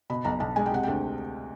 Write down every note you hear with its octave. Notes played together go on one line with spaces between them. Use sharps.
B2 B5
B1 A#5
B1 A5
G#3 G#5
G5
C3 F#5
D2 G5